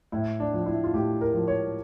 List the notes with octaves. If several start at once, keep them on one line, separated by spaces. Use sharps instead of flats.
A2 E4
D4
F3
E4
F4
A2 G4
A#4
F3
C#5